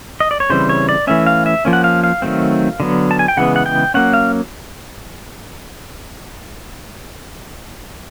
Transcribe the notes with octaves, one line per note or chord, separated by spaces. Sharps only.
D#5
D5
C#5
C#3 E3 G3 C4 C5
C#5
D5
E3 A3 C#4 E5
F5
E5
F3 A#3 C#4
F#5
F5
F5
D#3 F#3 A3 C4
D3 F#3 B3
A5
G#5
G5
C#3 E3 G#3 B3 F#5
F#5
G5
F#3 A#3 C#4 F#5
F5